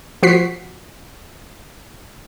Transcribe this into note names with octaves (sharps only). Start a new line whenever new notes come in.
F3 F#4 B6 C7